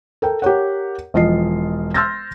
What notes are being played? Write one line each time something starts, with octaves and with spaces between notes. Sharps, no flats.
A4 A#4 G5
G4 A#4 C#5 F#5
E1 F3 F4 D#5 C7
C6 E6 F6 G6 A6 A#6